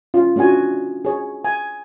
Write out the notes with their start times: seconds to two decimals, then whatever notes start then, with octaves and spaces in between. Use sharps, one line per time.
0.14 C#4 F4
0.36 A3 C#4 D4 F#4 G#5
1.05 G#4 C#5
1.45 G#5